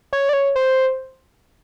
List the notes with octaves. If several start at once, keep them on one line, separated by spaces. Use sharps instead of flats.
C#5
D5
C#5
C5